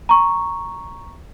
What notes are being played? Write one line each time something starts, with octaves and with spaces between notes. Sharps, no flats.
A#5 C#6